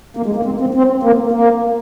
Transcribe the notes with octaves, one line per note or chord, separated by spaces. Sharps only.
A#3
G#3
A#3
C4
C4
C4
A#3
A#3